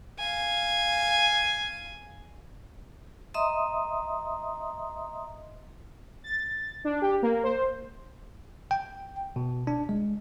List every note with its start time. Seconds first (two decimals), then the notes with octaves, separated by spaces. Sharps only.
0.18 F5 G#5
3.34 D#5 E5 A#5 C6 D#6
6.24 A6
6.85 D4
7.02 G4
7.22 A#3
7.44 C5
8.71 G5
9.36 B2
9.67 D4
9.89 G#3